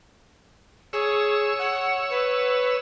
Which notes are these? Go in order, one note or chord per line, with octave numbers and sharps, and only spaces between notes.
G#4 C#5 E6
F#5
B4